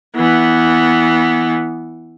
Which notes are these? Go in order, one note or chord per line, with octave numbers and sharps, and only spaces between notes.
E3 B3